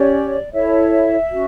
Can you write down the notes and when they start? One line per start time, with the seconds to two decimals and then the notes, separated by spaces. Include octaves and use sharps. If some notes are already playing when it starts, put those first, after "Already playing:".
Already playing: C#4 G4 C#5 D5
0.53 E4 A4 C#5 E5
1.32 C#4 F#4